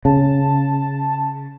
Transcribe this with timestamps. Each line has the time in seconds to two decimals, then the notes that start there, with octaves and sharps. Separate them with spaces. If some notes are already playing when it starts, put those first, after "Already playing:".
0.05 C#3 A5